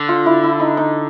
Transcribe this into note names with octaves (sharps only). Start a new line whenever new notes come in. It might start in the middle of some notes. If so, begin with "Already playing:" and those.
Already playing: D3
F4
E4
E4
D#4
D#4